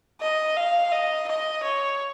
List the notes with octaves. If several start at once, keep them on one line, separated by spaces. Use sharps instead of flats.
D#5
F5
D#5
D#5
C#5